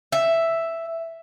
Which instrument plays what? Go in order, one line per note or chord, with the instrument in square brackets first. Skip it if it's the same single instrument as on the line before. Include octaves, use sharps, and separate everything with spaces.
[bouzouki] E5